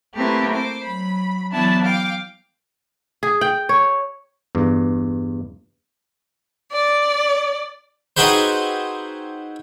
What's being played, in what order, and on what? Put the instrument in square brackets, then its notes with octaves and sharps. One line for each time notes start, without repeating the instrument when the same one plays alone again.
[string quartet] A3 A#3 C4 E4 G4 B4
C5 D6
F#3 B5
E3 F#3 B3 D4 E4 A5
F5 G5 D6
[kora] G#4
G5
C#5
[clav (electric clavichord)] E2 G2
[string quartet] D5
[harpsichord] C4 D#4 F#4 G#4 B4 C5